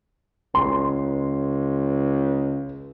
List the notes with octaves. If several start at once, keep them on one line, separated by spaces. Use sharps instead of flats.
C#2 C6